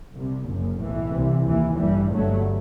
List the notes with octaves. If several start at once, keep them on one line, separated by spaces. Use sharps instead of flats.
C2 C3
F#1 F#2
B1 A2 E3
C2 C3
D#2 E3
A1 G2 E3 G3
G1 G2 F#3 A3